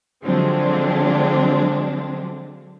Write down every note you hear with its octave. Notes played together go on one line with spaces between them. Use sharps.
D3 F3 F#3 G#3 C4 D4